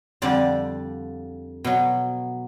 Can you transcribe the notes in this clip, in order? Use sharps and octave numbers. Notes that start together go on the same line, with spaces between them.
F2 D3 G3 D5
B2 F#3